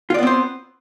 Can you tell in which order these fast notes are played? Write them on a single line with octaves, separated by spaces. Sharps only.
F4 D5 B3 C4 C5